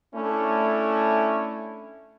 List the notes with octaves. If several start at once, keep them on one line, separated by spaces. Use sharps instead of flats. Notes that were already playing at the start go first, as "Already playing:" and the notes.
A3 C#4 D4 E4